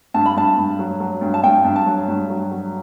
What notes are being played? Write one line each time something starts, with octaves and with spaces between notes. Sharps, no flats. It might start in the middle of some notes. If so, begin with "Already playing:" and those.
G2 A5
B5
G2 A5
G2
F#3
F#3
G2
A5
G2 G5
G2
A5
F#3
G2
F#3
F#3